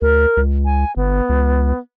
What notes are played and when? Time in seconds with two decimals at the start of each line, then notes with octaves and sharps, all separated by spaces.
0.02 D2 A#4
0.37 C#2
0.65 G#5
0.96 G1 B3
1.29 C#2